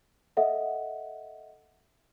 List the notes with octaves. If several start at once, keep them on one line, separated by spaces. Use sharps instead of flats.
A4 D#5 E5 F#5